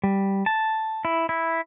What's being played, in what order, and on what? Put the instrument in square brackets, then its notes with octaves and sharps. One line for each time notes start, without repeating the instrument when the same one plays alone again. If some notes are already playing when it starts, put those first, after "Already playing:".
[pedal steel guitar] G3
A5
E4
E4